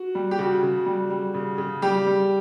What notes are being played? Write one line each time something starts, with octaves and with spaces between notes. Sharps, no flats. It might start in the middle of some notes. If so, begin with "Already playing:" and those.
Already playing: F#4
G3
G4
C#3 F#4
C#3
G3
G3
C#3
C#3
G3 G4
G3